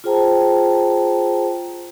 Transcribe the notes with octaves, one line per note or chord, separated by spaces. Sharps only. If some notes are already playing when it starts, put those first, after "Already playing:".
F4 G#4 C5 G5 A5 A#5